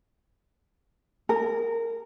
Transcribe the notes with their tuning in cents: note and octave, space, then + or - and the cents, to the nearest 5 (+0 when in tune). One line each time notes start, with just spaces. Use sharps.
A#4 -20